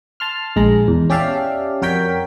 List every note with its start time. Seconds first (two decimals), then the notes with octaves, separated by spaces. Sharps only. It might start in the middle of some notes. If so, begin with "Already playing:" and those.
0.20 A5 C6 F6
0.56 A#1 G#3 A#5
0.88 E2
1.10 C#4 G4 D5 E5 F5 A5
1.82 F2 F#4 A#4 C#5 G5 B6